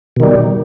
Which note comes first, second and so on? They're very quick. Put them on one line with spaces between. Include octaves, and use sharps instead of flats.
B2 D#3 G3